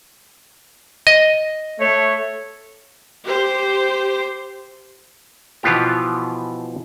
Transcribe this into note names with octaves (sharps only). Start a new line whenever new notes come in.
D#5
A3 C#5
G4 C5
B2 E3 F3 B3 F4 G4